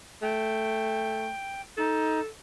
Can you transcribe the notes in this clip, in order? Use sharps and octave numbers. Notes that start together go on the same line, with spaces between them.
A3 G5
D#4 A4